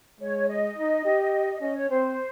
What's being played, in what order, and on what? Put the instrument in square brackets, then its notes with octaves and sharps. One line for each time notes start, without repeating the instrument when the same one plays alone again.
[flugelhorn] G#3 [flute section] C#5
[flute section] D#5
[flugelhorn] D#4
G4
[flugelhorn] C#4 [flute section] D#5
[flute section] C#5
[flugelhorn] C4 [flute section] C5